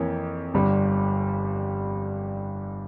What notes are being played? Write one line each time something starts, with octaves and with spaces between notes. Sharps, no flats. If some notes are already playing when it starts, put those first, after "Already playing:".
Already playing: F2 E3 A#3 C#5
G1 G2 G3